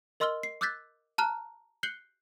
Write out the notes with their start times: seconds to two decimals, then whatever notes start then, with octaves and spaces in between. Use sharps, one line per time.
0.20 A#4 D#5 C6 E6 F6 G7
0.43 C7
0.61 D6 E6 F#6 G6 A6 B6
1.18 A5 A#5 F6 F#6
1.83 F#6 G6 C7 C#7 F#7 G7